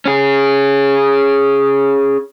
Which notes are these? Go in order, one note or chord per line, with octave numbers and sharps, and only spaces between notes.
C#4 G#4